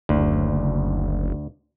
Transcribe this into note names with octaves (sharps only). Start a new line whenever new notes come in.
F#1 D2